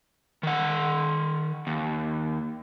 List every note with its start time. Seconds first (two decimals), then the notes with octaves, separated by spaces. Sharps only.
0.43 D#3 F#5
1.67 D#2